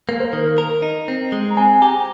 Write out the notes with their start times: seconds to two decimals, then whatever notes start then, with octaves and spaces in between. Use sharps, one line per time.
0.08 A#3 A#4
0.20 C5
0.25 A#4
0.33 D#3
0.58 A#4
0.82 D#4
1.08 C4
1.32 G#3
1.50 A#5
1.57 C4 G#5
1.82 G4 A#5